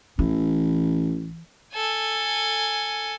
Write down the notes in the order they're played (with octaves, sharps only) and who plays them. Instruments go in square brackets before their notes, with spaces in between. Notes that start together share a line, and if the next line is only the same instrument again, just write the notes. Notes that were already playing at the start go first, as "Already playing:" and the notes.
[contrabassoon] A1 [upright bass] E3
[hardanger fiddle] A4 G#5